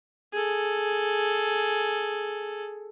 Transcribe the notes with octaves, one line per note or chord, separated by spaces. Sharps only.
G#4 A4